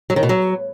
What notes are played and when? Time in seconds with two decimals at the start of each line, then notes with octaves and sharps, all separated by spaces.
0.10 F#3
0.16 D#3
0.23 B2
0.29 F#3